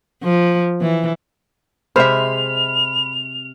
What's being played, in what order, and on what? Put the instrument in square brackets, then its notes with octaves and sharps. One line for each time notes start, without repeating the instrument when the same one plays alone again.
[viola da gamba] F3
E3
[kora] C3 G#3 [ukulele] C5 E5 [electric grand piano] B5 F6 C7 [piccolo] F7